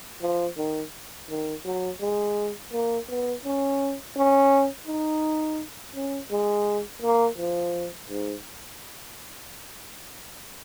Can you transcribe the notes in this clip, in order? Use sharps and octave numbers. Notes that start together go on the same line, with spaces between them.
F3
D#3
D#3
F#3
G#3
A#3
B3
C#4
C#4
D#4
C#4
G#3
A#3
F3
G#2